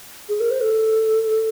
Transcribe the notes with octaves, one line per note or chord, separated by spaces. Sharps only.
G#4
A#4
C5
A4